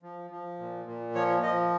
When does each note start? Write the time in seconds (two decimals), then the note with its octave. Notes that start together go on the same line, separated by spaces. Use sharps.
0.03 F3
0.31 F3
0.59 A#2
0.86 A#2
1.15 F3 C#5
1.43 F3 D#5